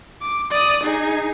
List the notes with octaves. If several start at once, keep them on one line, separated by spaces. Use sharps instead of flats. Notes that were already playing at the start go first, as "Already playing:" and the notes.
D6
D5 D#6
D#4 G#4